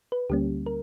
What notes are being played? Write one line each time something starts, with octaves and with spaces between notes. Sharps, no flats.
B4
D2 D3 G3 A#3 C#4 G4
A#4